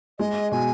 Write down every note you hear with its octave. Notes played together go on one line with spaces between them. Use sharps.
G#3 D#5
B2 G#5